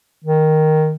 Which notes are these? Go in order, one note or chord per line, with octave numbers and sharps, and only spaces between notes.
D#3